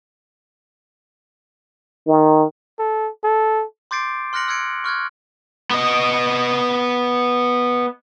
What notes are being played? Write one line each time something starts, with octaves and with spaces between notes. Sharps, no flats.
D#3
A4
A4
C6 D6 G6 A6 C7 D7
C6 F6 F#6 A#6 C#7 F#7
E6 F#6 G#6 C#7 D7
C#6 F6 F#6 G#6
B3 D#5